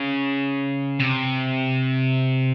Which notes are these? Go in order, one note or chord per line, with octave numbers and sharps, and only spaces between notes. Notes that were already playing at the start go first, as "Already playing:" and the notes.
Already playing: C#3
C3